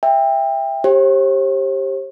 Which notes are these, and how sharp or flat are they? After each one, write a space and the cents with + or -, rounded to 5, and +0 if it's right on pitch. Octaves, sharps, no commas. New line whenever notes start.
E5 +0 G5 +25
G4 +0 C5 +45